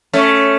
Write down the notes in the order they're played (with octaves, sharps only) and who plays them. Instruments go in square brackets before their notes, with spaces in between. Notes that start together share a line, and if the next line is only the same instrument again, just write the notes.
[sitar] A3 C#4